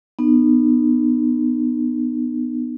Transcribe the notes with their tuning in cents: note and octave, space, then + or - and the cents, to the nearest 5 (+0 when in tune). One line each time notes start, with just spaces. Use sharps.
B3 +0 D#4 -35